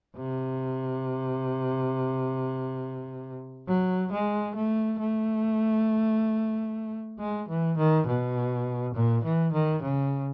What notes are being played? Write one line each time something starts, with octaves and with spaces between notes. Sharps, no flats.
C3
F#3
G#3
A3
A3
G#3
E3
D#3
B2
A#2
E3
D#3
C#3